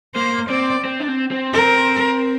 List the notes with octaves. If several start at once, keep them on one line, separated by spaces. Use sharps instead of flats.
A#3 C5
C4 D5
C4
D4
C4
C4
A#4